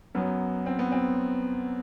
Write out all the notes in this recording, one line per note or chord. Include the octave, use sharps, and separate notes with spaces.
F#2 F#3 B3
C4
B3
C4